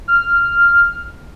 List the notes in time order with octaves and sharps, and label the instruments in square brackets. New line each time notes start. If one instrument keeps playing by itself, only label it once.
[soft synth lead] F6